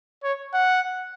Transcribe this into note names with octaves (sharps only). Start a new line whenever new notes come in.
C#5
F#5